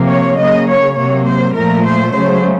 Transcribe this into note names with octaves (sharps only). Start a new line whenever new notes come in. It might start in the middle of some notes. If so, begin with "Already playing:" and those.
Already playing: C3 F3 A#3
C#5
C#3 F#3 A#3 D#5
C#5
C3 F#3 A#3 C#5
C5
A#2 F3 A3 A#4
C5
C#3 F#3 A3 C5